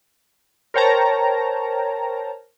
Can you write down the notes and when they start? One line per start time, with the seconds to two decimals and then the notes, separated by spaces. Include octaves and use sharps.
0.74 A#4 C5 C#5 G5 A5 A#5